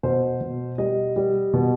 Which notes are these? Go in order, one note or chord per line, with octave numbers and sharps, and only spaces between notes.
B2 C5
B2
G3 D#5
G3
B2